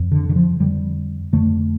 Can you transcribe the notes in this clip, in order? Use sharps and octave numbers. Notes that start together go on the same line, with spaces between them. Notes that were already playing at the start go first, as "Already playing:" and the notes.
Already playing: F2
D3
D3
F3
F2 D3 G3
F2 D3 A3